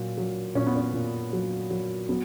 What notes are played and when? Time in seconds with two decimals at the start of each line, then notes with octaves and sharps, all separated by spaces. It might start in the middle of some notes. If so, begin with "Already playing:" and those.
Already playing: A#2 F#3
0.18 F#3
0.55 A#2 C#4
0.67 B3
0.76 C#4
0.93 A#2
1.33 F#3
1.71 F#3
2.09 F#3 B3